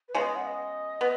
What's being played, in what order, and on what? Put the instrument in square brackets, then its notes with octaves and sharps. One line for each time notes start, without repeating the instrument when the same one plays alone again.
[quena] B4
[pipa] C#3 G#3 B3 [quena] C#5
[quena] D#5
F#5
D#5
[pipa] B3